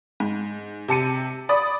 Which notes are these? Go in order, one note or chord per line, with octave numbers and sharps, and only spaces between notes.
G#2
C3 A5 C#7 D#7
D5 B5 D#6